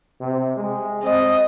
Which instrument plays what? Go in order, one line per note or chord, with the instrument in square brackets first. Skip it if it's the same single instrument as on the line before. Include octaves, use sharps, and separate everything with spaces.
[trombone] C3
G#3
[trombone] C4 [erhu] D#5